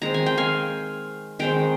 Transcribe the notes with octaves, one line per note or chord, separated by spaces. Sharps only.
D#3 G#3 C4 A#5
G#5
G5
F5 G#5
D#3 G#3 C4 G5 A#5